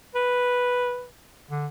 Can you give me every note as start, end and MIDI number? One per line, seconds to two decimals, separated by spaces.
0.15 1.06 71
1.51 1.67 50